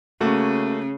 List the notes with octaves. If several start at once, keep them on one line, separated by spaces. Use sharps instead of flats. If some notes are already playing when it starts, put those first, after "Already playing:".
C#3 A3 A#3 F#4